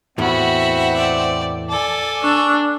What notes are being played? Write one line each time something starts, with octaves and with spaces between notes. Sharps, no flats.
E2 A2 C4 F#4 E5 F#5 B5
D5
A4 D5 G#5 D6
D4 C#6 E6